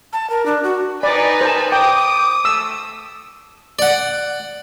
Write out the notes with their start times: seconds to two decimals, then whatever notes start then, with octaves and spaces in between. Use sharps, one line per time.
0.13 A5
0.30 A#4
0.46 D4
0.63 F#4
1.03 D#4 B4 D5 G#5 B5
1.41 A#4 C5 A5
1.72 G5 D6 D#6
2.45 A3 E6
3.79 D5 F#5